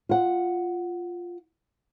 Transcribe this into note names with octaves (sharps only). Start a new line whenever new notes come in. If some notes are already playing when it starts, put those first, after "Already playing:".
F4 F#5